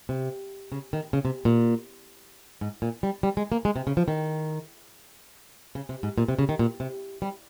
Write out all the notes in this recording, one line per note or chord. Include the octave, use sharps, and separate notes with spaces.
C3
C#3
D#3
C#3
C3
A#2
G#2
A#2
G3
G3
G#3
A#3
G#3
C3
C#3
F3
D#3
C#3
C3
G#2
A#2
C3
C#3
D#3
A#2
C3
G3